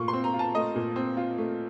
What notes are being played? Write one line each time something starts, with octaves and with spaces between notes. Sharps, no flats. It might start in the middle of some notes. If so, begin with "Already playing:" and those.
Already playing: A#2 A3 F4 C#6
C6
C4
A#5
F4
A5
A3 D#5
A#2
C4
F4
A3